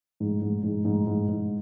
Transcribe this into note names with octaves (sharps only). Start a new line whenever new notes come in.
G#2
G#2
G#2
G#2
G#2
G#2